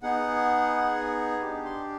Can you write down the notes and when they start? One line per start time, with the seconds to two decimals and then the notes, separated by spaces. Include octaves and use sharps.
0.03 B3 D#4 G#4 F#5
1.41 D4 G4
1.65 C6